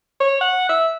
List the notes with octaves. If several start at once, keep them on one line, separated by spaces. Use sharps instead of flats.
C#5
F#5
E5